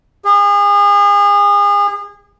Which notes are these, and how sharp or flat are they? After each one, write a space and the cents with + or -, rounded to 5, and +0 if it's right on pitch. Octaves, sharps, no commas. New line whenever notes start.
G#4 -35